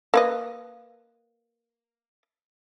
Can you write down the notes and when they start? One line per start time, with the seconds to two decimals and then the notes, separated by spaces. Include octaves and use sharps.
0.14 A#3 B4 D#5